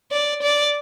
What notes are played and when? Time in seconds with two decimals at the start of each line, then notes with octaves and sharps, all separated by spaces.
0.12 D5
0.42 D5